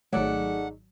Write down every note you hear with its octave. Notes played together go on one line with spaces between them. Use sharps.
G#1 F#3 A3 D#4 G#4 D5 F#5